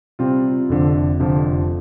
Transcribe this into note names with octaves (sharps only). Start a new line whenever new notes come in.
C3 G3 C4 F4
F1 F2 D3 F3
F1 F2 D3 F3